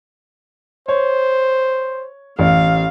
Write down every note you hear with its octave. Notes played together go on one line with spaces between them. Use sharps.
C5 C#5
A1 F5